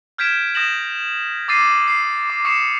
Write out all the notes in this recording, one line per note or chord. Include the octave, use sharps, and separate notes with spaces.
F6 G6 G#6 B6 D7 E7
D#6 G6 A#6 E7 F#7
D6 E6 A6 C7 D#7
C7
D6
C#6 D#6 C7 C#7 E7